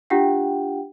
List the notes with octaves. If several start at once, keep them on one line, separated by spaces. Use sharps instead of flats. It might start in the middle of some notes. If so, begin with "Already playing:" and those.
D4 F4 G4 F#5 G5